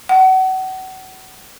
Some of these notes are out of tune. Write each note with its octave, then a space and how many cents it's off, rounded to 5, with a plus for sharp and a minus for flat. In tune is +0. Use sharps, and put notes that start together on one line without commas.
F#5 +30